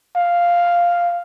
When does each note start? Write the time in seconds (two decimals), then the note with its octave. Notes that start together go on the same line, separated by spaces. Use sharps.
0.16 F5